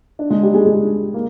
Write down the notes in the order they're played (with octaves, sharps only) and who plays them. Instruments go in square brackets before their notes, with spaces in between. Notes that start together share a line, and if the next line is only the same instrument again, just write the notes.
[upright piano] D4
G#3 G#4
G3 G4
G#3 G#4
G#3 G#4
A#3